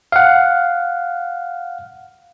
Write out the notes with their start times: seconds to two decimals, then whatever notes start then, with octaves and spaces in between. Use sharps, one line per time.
0.12 F5 F#5